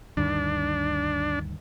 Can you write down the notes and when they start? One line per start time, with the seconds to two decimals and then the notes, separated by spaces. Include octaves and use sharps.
0.17 D2 G2 D#3 D4